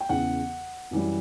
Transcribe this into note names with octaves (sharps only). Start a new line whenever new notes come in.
G5
E2 C#3 E3 F#5
F#2 E3 G3